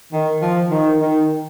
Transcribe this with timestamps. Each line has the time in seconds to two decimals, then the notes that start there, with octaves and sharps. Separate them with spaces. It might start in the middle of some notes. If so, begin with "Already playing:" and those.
0.13 D#3
0.42 F3
0.71 D#3
0.99 D#3